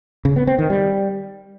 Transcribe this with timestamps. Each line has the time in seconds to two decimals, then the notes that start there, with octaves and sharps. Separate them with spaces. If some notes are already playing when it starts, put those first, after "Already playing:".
0.25 C#3
0.36 B3
0.47 C4
0.59 D#3
0.70 G3